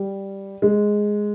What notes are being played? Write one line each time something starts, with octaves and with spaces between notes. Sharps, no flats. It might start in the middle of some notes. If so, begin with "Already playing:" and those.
Already playing: G3
G#3